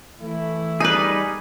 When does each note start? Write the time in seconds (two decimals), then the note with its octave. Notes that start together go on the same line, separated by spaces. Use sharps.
0.21 E3 A3 E4
0.80 G3 D#4 G#4 B4 G#5